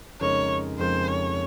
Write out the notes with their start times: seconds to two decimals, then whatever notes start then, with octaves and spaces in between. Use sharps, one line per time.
0.20 F2 C#3 G#3 D#4 A#4 C#5
0.79 F2 C#3 G#3 D#4 A#4 C5
1.08 C#5